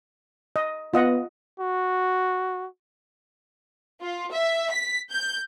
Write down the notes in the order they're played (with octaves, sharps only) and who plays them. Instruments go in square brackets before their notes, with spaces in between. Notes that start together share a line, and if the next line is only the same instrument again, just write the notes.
[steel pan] D#5
[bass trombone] B3 [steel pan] F4 D#5 F#5
[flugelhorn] F#4
[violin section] F4
E5
B6
G6